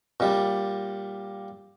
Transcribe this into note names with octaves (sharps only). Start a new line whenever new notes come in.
A#2 G3